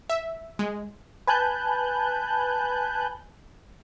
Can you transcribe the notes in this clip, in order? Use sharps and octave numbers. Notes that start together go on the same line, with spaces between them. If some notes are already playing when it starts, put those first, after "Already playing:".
E5
G#3
B4 G#5 A5 F#6 G6